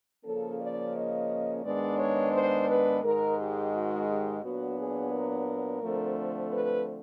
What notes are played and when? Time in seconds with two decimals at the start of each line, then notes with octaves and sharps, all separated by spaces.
0.25 C#3 F3 A#3 C#4 A4
0.60 D5
0.95 D#5
1.64 G#2 D#3 G#3 B3 D4 D5
1.99 C#5
2.33 C5
2.69 B4
3.03 G#2 D#3 G#3 A#4
3.38 G4
3.73 F#4
4.08 G4
4.43 A#2 F#3 B3 D4 F#4
4.78 G#4
5.13 A#4
5.82 D3 F3 A3 C4
6.51 B4